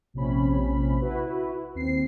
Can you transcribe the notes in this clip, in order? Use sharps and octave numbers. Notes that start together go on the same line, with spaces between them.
A#1 C3 C#4 B5
E4 F#4 B4
D#2 C4 C7